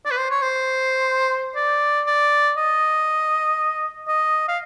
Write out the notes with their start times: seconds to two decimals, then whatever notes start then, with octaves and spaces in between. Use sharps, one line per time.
0.05 D5
0.11 B4
0.17 C5
0.31 C#5
0.42 C5
1.56 D5
2.06 D5
2.57 D#5
4.08 D#5
4.48 F5